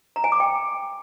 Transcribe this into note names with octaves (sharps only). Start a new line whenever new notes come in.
A#5
G#5
D6
G5